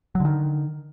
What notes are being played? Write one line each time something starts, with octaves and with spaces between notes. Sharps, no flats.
D3 D#3 F#3